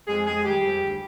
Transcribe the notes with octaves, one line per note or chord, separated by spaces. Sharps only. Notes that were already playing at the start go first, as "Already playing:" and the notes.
F2 G#3 G#4
F2 G#3 G#4
D#3 G3 G4
F2
D2